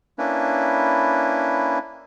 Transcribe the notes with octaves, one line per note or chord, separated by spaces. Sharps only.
A#3 C#4 D4 E4 B4